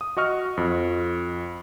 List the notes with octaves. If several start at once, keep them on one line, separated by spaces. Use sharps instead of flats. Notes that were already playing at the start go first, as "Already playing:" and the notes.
D#6
F#4 D#5 C#6 F6
F2